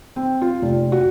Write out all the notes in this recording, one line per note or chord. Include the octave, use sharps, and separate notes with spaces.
C4
F4
F1
F#4